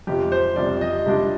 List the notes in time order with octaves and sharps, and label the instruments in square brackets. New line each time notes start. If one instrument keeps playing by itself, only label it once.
[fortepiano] F2 C3 F3 [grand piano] G4
[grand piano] C5
[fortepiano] F2 C3 F3 [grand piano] D5
[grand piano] D#5
[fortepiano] C3 G3 D4 F4